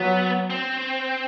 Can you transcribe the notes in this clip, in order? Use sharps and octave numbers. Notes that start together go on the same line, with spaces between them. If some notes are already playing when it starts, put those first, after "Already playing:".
Already playing: F#3 B3
C4